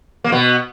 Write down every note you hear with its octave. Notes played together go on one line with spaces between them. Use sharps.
A#3
B2 B3